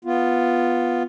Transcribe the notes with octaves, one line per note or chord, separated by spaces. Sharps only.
B3 F4